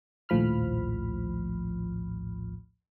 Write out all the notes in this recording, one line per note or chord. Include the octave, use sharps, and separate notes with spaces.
A#1 D#2 A2 F3 B5 F6